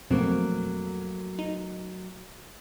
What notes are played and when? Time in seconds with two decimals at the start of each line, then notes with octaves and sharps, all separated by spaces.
0.10 F2 B2 F#3 A3 A#3 C4
1.39 D#4